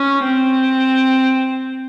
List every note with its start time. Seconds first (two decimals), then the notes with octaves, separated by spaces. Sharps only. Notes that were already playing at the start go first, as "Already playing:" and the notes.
Already playing: C#4
0.23 C4